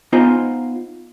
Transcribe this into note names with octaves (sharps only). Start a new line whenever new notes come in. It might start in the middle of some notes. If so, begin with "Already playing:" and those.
B3 D#4 F4 C5 G#5 A#5